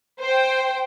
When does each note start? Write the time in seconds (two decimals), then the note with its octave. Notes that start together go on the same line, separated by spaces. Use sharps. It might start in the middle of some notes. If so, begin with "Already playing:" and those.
0.22 C5 G5